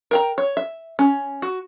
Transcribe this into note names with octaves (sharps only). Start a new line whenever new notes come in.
A#4 G5 A#5
C#5
E5
C#4
F#4